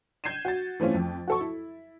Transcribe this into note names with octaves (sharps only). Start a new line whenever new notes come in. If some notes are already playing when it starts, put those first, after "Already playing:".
G6 G#6 C7 D#7 E7
F#4 A6
E3 A3 C4 C#4 F4
F2
F#4 A4 C#6
E4